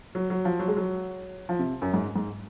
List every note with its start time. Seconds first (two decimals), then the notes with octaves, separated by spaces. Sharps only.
0.15 F#3
0.30 F#3
0.45 F3
0.59 F#3
0.68 G#3
0.77 F#3
1.49 F3
1.59 C3
1.82 F#2
1.94 G#2
2.16 G#2